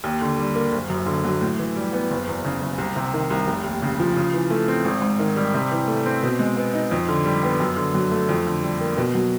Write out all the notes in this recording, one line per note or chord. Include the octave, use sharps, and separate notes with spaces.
D#2
D3
G3
A#3
F#1
F#2
D3
F#3
A2
E3
G3
B3
F#1
E2
C#3
F#1
C2
C3
D#3
C2
F1
D#2
C#3
F3
C#3
E3
A3
C4
G#1
G#2
D#3
G3
C3
E3
A3
C4
B2
G#3
B3
D#4
F2
D3
G3
B3
F#2
D3
F#3
A3
F2
D3
G3
A#3
B2
F#3